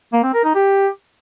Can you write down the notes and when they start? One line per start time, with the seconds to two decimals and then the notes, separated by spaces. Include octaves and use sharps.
0.13 A#3
0.23 C4
0.34 A#4
0.44 D#4
0.55 G4